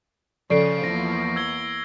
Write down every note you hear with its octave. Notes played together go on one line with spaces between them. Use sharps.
C#3 F3 A4 D5 C#6 C7 D7
E2 A#3 E4 A#6
E6 G#6 G7